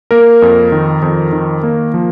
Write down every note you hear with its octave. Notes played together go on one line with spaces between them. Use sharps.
A#3 A#4
F2
D#3
F2
D#3
A#3
F3